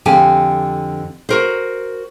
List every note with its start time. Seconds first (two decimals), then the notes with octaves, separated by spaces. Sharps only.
0.06 F2 D3 G4 G#5
1.29 F#4 A#4 C5